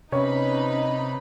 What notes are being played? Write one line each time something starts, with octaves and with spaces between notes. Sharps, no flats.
C3 C#4 D#4 B4 C#5 B5